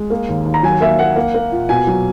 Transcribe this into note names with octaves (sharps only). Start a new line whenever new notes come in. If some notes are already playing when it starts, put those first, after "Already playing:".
Already playing: G#3
A#3
D#2
D#2
A#5
F#3 G#5
A#3 E5
A#3 F#5
A#3
A#3
A#2
B2 G#5
F#3